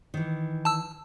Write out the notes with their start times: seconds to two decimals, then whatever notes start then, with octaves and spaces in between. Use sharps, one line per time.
0.14 D#3 E3
0.65 A5 E6